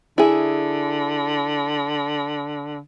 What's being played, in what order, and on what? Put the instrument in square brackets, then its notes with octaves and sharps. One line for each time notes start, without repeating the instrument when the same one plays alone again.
[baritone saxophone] D3 [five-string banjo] E4 G#4